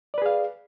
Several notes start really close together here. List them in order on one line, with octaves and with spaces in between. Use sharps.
D5 B4 G#4 F5